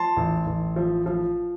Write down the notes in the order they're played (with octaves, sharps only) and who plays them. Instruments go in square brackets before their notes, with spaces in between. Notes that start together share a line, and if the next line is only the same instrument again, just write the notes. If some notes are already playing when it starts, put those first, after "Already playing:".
Already playing: [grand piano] F3 A5 C6
A1
A1
F3
F3